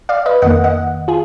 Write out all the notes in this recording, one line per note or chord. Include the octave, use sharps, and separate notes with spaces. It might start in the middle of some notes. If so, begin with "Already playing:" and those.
D5 F5
B4 D#5
F2 D#3 A#3 D#5 F#5
D#5 F#5
F4 G#4